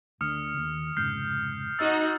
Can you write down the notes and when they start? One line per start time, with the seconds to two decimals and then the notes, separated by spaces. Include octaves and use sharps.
0.21 D2 D3 D#6 F6 C#7
0.57 D#2
0.97 F1 G#2 C#3 F6 G6 C7
1.79 D#4 F#4 D#5 E6 A6